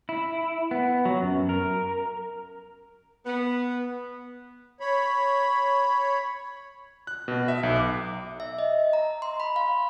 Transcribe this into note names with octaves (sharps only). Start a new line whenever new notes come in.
E4
B3
F#3
F#2
A#4
B3
C#5 B5
F#6
B2
E5
B1
D6
E5
D#5
A#5
C6
B5
F5